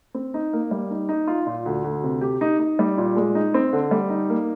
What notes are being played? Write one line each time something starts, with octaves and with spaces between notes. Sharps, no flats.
C4
D#4
A#3
G3
D#4
D#4
F4
A#2
D2
D2
C3
G4
D#4
D#4
G3
A#2
G#3
D#4
C4
D3
G3
D#4
A#3